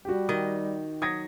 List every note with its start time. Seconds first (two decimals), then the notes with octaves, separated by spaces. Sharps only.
0.05 G3 F#4 G4
0.29 D#3 D#5
1.02 F#3 D#6 G#6 A#6